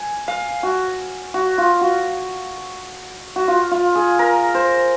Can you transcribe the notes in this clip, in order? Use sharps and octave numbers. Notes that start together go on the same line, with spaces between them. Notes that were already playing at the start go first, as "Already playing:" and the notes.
Already playing: G#5
F5
F#4
F#4
F4
F#4
F#4
F4
F4
G#4
A#4
C5